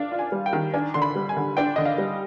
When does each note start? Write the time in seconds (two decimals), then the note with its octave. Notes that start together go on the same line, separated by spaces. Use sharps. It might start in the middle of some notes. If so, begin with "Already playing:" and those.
Already playing: D4 F5
0.12 F4
0.19 G#5
0.32 G3
0.46 G5
0.53 D#3
0.74 D4 G#5
0.94 D3 C6
1.02 B5
1.16 G3
1.29 G#5
1.37 D3
1.57 D4 G5
1.76 D3 D#5
1.86 F5
1.98 G3